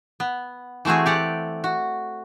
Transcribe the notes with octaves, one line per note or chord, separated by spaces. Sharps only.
B3
E3 A3 C4 F#4 G#4
G4 D5 F#5
F#4